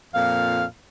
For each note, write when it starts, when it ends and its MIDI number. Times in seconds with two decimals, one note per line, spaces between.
0.14 0.65 41
0.14 0.65 46
0.14 0.65 77